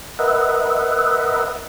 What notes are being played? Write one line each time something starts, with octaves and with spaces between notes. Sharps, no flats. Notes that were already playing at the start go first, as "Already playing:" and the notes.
A#4 B4 D#5 E5 F#5